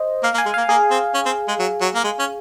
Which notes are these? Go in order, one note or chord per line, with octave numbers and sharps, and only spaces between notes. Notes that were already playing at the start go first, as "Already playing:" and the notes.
Already playing: C5 D#5
A#3 F5
A#3
G#5
G#3
A#3 F5
A#3 G#4
C4
C#4
C4
G#3
F#3
F#3
A#3
G#3
C#4